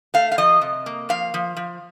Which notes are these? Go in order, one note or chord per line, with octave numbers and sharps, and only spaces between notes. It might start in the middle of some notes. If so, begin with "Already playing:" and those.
A3 F5
F5
F3 D#5
C3
A#3
F3 F5
F3
F3